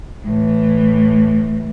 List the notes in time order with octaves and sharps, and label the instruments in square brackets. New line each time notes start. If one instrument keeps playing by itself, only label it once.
[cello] A2 E3